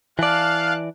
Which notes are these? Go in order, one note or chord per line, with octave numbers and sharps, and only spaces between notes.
E3 D5 F5 A5 F#6